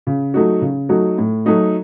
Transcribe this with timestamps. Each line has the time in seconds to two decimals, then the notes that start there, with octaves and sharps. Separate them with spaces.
0.07 C#3
0.34 F#3 A3 D#4 F#4
0.62 C#3
0.89 F#3 A3 D#4 F#4
1.18 A2
1.46 F#3 A3 D#4 F#4